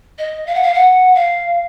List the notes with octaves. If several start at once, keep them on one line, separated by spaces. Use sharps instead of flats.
D#5
F5
F#5
F5
F#5
F5